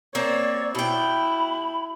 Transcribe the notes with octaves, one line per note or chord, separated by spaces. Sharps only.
A#3 C4 C#5 D5
B2 E4 G5 B5